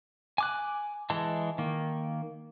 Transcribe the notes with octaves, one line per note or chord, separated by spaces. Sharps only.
G#5 D6 F#6
E3 G#3 A5
D#3 A#3